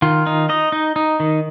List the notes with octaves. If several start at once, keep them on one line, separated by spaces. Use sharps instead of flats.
D#3 F4
D#4
D#4 D#5
D#4
D#4
D#3